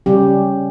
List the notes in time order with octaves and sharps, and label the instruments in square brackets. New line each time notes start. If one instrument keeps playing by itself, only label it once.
[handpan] C#3 G3 C#4 G4